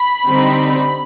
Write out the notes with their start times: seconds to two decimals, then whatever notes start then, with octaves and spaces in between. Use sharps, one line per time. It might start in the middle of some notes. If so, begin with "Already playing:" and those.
Already playing: B5
0.26 D3 G3 C4 D#4